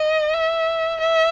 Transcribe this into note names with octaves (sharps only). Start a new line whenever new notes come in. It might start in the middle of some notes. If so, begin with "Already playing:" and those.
Already playing: D#5
E5
E5